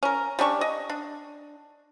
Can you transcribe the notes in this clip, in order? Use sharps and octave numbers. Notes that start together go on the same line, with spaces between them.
C#4 A#4
G3 C#4 D4 C#6
D#5
D4